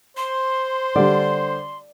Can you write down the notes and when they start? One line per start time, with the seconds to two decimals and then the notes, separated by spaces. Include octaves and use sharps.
0.17 C5 C6
0.96 D3 G3 D5